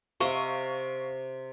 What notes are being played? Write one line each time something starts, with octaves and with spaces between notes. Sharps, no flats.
C3 C4 D#5 F5 C#6